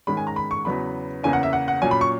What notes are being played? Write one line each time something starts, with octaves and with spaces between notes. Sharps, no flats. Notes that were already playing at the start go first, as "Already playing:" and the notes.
G#2 D#3 G#3 C#4 B5
G#5
A#5
B5
C#6
E2 C#3 F#3 B3 B5
E2 C#3 E3 A#3 C#4 G#5
F#5
E5
F#5
F#5
A#2 F#3 C#4 G#5
B5
C#6